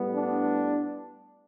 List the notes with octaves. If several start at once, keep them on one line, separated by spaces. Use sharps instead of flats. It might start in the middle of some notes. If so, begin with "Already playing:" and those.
Already playing: A2 G3 B3
D4